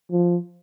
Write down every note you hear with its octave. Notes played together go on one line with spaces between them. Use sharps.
F3